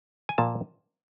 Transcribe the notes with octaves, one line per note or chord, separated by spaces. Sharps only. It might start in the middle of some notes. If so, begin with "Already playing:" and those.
G#5
A#2 F3 A#3 A5